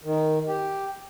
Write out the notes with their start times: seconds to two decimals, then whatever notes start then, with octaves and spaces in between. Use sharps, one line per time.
0.05 D#3
0.48 G4